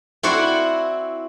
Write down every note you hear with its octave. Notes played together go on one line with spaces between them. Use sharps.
C4 E4 F#4 D5 F#5